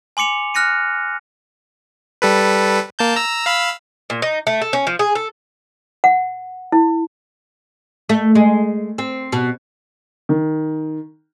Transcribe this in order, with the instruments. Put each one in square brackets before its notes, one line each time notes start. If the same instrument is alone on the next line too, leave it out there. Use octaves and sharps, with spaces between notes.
[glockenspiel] G#5 C6 D6 C#7 F7
F6 F#6 A#6 C#7 D#7
[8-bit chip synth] G3 A4 B4
A#3 A5 G6
A#5 E6
F5 B5 E6
[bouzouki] A#2
D#4
A3
A4
C#4
F3
G#4
A4
[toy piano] F#5
E4
[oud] A3
G#3
C4
B2
[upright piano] D#3